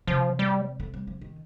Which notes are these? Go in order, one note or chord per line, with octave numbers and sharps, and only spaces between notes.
C3 F3
G3
A3
G3
F3
D#3